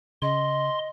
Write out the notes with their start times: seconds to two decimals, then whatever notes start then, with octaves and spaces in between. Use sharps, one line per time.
0.22 C#3 D#5 C6